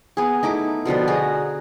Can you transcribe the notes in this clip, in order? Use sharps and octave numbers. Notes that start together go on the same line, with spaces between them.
B3 G#4
A3 D#4 E4 D6
B2 D3 F3 G3
F#4 G#4 A#5